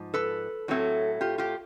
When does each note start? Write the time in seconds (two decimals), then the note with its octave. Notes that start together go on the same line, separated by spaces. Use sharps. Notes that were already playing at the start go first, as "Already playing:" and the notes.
Already playing: G#2 F3
0.14 A4 B4
0.68 A2 F#3 A3 C4
1.21 F4 G4
1.38 F4 G4